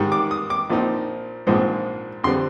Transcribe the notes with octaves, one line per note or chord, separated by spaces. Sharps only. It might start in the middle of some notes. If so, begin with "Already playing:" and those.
Already playing: G#2 D#3 G3
D6
D#6
D6
A#1 A#2 F3 C4 D#4
A#1 G#2 F3 G#3 C4
F2 D3 G3 C4 C6